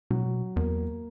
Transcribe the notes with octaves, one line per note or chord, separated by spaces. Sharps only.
B2 F#3
E2 A#3